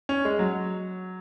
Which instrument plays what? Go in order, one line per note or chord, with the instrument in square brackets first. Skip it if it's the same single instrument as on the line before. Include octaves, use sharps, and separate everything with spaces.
[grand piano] C#4
G#3
F#3